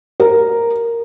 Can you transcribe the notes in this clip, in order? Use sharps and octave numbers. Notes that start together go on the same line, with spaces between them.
A#4